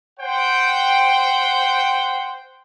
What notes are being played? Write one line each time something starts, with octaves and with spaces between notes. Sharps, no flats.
C5 F#5 G5